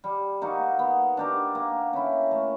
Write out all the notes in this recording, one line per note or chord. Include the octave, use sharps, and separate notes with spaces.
G3
A#3 D#4 F#4
B3
D4 G4 A#4
A#3
C#4 E4
A3